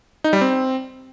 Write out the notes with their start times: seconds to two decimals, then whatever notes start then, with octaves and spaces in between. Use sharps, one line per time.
0.24 D#4
0.33 G3
0.41 C4